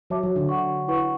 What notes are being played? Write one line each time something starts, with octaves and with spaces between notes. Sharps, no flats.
F#3 F#4 C#5 E5 A5 D6
F#3
D3
C#5 F#5 C#6
E4 B4 F#5 C#6